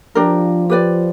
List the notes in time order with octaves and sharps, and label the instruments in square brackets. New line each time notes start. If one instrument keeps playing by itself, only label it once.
[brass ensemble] F3 [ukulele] D4 G4 A#4
[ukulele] G4 B4 D5